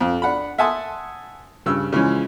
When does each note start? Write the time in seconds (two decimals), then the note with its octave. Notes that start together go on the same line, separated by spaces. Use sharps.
0.01 F2
0.22 D4 F#5 B5
0.58 E5 F#5 G#5 A5 C6 D#6
1.66 G2 C#3 E6
1.92 C#3 E3 F3 G#3 C#4